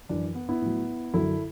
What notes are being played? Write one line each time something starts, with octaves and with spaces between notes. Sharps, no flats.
F#2 E3 D4
B3
B3 E4
A2 F#3
F#2 D3 F#3 E4 A4